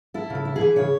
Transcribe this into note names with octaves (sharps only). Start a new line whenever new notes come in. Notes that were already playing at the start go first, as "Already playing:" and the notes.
E4 A4
C#3
A4
E4
G#4
E3
C#3 C#5